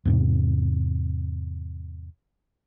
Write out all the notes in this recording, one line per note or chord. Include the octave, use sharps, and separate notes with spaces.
E2 G#2 C3